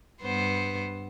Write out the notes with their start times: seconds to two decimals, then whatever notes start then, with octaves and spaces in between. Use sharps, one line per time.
0.22 G2 B3 C5